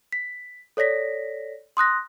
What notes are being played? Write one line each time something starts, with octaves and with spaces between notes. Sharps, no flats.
B6
A4 C#5 D5 A#6 B6
C6 D#6 F#6 A#6